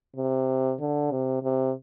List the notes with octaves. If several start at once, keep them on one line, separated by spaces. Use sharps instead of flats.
C3
D3
C3
C3